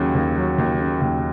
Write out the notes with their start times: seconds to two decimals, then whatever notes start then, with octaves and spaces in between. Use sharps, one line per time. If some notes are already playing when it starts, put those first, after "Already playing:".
Already playing: D#2 C#3 F#3
0.15 D#2
0.36 F#3
0.58 D#2
0.80 C#3
1.02 D#2